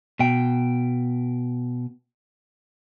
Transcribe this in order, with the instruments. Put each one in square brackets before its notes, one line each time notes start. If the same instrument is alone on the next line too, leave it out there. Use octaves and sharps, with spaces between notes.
[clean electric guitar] B2 G5